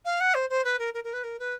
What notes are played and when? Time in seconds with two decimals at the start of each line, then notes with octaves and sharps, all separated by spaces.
0.05 F5
0.21 F#5
0.34 C5
0.50 C5
0.64 B4
0.79 A#4
0.94 A#4
1.04 A#4
1.13 B4
1.24 A#4
1.39 B4